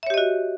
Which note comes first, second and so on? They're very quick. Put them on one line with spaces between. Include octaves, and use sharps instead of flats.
E5 C#5 G4 D#5 F#4